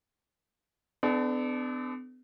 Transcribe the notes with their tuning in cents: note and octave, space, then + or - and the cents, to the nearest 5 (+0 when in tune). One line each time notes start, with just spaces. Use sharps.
B3 +45 D4 +20 A4 -30